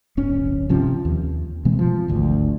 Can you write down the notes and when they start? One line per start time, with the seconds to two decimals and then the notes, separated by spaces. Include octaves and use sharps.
0.17 D1 G1 C#4
0.69 C3 F3 C#4
1.05 D#2
1.65 B2 E3 G#3 C4
1.79 F3
2.08 G#1 D2